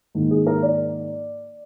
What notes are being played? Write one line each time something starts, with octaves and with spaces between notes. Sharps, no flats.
G#2 D#3 A#3
G#4
A#4
D5